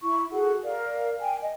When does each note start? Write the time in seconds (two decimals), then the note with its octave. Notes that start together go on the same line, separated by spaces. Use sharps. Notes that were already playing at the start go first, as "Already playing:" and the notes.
0.02 E4 C#6
0.31 F#4 G#4 A4 F#5
0.63 A#4 D5 F5
1.19 G5 G#5
1.42 D#5